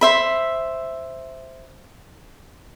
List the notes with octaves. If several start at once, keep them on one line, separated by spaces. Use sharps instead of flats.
C5 E5 B5